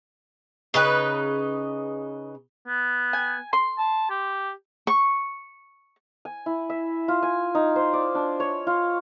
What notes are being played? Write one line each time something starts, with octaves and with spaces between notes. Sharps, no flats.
C#3 D#4 G4 B4
B3
G#5
C6
A5
G4
C#6
G#5
E4
E5
F4
G#5
D#4
C5
D5
D4
C#5
F4